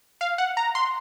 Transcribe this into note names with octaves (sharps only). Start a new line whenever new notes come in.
F5
F#5
A#5
C6